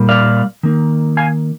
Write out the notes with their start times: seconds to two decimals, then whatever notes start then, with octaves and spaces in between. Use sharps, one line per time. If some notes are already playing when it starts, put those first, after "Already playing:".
Already playing: A#2 G3 A#3
0.09 D5 F5
0.63 D#3 A#3
1.17 F5 G#5